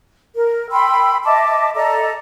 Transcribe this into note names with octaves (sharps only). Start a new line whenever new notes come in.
A#4
G5 B5 C6 E6
D#5 E5 A5 D6
A4 D5 D#5 A#5